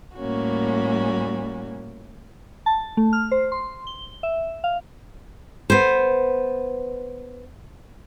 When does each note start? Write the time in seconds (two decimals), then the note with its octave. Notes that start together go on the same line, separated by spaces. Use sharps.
0.17 A2 G3 A#3 C#4 F#4
2.66 A5
2.97 A3
3.13 F6
3.31 C5
3.52 C6
3.87 G7
4.23 E5
4.64 F5
5.70 B3 C5